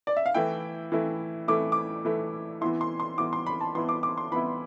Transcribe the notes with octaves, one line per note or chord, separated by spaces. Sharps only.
D5
E5
F5
E3 A3 E4 G5
E3 A3 E4
E3 A3 E4 D6
D6
E3 A3 E4
E3 B3 E4 C6
C6
C6
E3 B3 E4 D6
C6
B5
A5
E3 B3 E4 C6
D6
D6
C6
E3 B3 E4 B5